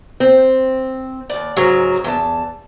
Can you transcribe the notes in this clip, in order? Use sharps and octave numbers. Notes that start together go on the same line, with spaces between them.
C4
D#2 D5
G#2 C#3 F#3 A#4
E2 F4 A5